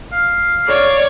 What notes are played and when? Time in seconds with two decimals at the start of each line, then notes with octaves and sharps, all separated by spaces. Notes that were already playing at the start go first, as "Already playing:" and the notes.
0.12 F5
0.68 C#5 D5